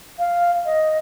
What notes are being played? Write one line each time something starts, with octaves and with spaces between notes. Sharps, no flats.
F5
D#5